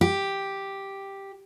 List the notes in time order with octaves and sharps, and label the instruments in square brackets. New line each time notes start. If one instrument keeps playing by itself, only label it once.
[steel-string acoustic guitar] G4